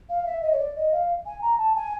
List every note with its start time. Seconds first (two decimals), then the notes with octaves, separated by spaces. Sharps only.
0.09 F5
0.26 E5
0.42 D#5
0.52 C#5
0.59 D5
0.76 D#5
0.92 F5
1.26 G#5
1.42 A#5
1.58 A5
1.76 G#5